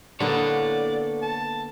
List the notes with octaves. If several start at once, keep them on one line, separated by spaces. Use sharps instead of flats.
D3 A#3 B3 A4 C#5 D5
A5